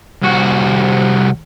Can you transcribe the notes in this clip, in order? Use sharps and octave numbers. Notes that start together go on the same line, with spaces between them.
C2 F#4